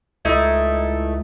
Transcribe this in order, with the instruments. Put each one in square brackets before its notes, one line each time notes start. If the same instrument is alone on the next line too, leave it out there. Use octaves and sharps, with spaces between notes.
[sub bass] C#2 [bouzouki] A3 D#4 E4